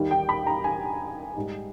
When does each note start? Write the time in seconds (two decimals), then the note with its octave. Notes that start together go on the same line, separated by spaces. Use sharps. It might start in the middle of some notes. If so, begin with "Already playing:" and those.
Already playing: D#2 D#3 G3
0.11 G5
0.29 B5
0.47 A#5
0.64 G#5
1.36 G#2 G3